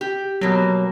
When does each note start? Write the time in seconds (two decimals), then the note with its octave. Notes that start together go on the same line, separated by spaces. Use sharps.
0.01 G4
0.41 B2 F#3 A#3